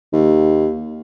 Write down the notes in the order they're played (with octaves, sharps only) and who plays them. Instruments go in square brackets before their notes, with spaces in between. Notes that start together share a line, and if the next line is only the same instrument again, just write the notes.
[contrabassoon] D#2